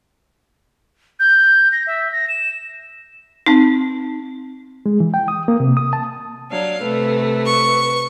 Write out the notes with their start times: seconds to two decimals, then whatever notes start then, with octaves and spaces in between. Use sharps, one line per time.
1.20 G6
1.72 A#6
1.87 E5
2.12 A#6
2.29 E7
3.46 C4 D#4
4.86 G#3
5.00 E3
5.14 G5
5.28 D#6
5.48 A#3
5.60 C3
5.77 D#6
5.93 A5
6.51 F#3 D4 F5
6.82 C3 A3 B4
7.46 C#6